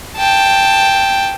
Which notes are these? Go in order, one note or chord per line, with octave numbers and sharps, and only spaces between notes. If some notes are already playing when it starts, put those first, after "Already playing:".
G5 A5